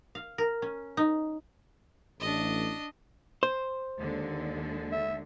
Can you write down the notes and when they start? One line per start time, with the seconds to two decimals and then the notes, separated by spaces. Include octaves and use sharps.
0.15 F5
0.38 A#4
0.62 C#4
0.97 D#4
2.20 A1 D4 D#5
3.43 C5
3.97 D#2 D3 G#3
4.92 E5